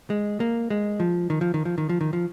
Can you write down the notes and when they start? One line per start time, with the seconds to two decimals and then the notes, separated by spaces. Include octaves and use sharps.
0.10 G#3
0.40 A#3
0.70 G#3
1.00 F3
1.30 D#3
1.41 F3
1.54 D#3
1.65 F3
1.78 D#3
1.89 F3
2.01 D#3
2.13 F3